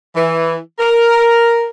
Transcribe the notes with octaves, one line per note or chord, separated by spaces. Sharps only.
E3
A#4